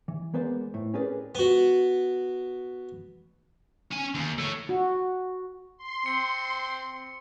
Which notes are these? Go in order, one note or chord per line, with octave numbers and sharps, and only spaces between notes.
E3
G#3 A#3 B3 C5 D5
A2
C#4 G4 G#4 A#4 B4 D5
B3 F#4
C#4 G#5
D#2
A4 C#5
F#4
C6
C4 C#7